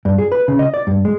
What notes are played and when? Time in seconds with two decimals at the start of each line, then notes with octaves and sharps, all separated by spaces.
0.05 G2
0.18 G#4
0.32 B4
0.48 C#3
0.59 D#5
0.74 D5
0.87 G2
1.05 G#3